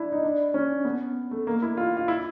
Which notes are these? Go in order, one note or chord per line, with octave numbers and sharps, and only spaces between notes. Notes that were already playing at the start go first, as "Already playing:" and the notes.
Already playing: D4 E4
D#4
D4
C#4
B3
A3
A#3
E4
F4
F4
E4